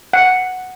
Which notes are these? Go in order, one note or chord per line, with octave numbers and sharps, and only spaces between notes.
F#5